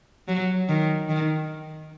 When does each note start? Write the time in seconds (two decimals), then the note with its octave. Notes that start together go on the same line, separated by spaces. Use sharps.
0.28 F#3
0.69 D#3
1.09 D#3